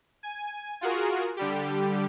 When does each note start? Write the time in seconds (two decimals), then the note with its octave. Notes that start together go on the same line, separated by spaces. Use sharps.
0.23 G#5
0.81 F4 F#4 G#4 A#4
1.37 D3 G3 G4